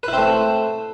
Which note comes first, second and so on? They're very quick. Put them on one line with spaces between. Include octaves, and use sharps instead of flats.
B4 E4 C4 A3